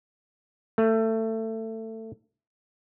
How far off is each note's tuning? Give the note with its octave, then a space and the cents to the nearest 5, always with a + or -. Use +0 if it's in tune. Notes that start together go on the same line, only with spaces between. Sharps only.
A3 +20